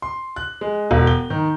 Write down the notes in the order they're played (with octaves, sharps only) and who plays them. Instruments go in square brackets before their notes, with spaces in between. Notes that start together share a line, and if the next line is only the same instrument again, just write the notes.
[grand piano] C6
F#6
G#3
E1
G7
D#3